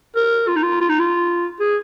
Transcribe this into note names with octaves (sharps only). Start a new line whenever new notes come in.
A#4
F4
D#4
F4
F4
D#4
F4
G#4